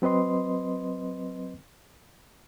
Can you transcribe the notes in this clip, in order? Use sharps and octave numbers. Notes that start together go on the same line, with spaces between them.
F#3 C4 B4 D#5 C6